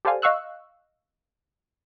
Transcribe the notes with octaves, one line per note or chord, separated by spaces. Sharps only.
G4 A4 C5 D5 F5 G#5
D#5 F5 C#6 E6 F#6